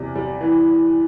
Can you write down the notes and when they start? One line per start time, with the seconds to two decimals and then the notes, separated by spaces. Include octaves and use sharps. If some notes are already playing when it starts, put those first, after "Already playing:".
Already playing: E2 C3 G3
0.16 G3
0.41 E3